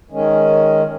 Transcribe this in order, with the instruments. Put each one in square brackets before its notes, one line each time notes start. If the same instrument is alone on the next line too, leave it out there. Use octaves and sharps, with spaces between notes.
[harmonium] D#3 G#3 C#4